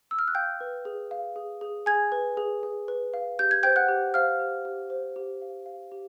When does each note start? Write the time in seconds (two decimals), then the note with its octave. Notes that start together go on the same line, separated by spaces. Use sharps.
0.11 E6
0.19 F6
0.28 F#6
0.35 F5 G5 G6
0.61 B4
0.85 G#4
1.11 F5
1.36 G#4
1.61 G#4
1.86 G#4 G#5 G#6
2.12 B4
2.37 G#4
2.63 G#4
2.88 B4
3.14 F5
3.39 G4 G6
3.51 G#6
3.63 C5 G5 G6
3.76 F#5 F#6
3.89 G4
4.14 C5 F5 F6
4.40 G4
4.65 G4
4.90 C5
5.16 G4
5.42 F5
5.66 F5
5.92 G4